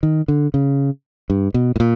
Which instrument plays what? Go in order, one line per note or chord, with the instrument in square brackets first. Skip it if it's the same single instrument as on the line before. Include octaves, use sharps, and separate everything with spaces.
[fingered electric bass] D#3
D3
C#3
G2
B2
A2
A#2